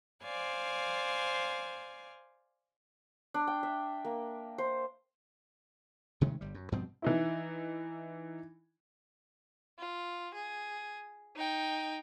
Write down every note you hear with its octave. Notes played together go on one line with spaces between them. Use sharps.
C5 D5 F5 G#5
D4
G5
E5
A#3
C5
C3 D#3 G#3 A3
G1 G3
F#2
G2 B2 F3 C4
E3 D#4 E4
F4
G#4
D#4 G5